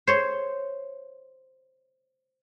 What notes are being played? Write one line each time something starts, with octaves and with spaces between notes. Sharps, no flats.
C5 C#5